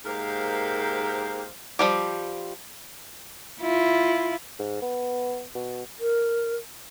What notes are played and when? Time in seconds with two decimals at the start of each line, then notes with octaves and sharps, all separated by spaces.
0.06 G#2 A#3 G4 A#4 C5 F5
1.79 F3 G3 G4
3.60 E4 F4
4.59 G#2
4.82 B3
5.55 B2
6.00 A#4